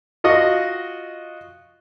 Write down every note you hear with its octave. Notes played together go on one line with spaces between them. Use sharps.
F4 F#4 D#5 F#5